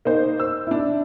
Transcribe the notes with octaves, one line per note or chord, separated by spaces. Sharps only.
A#3 D#4 C5
E6
D4 E4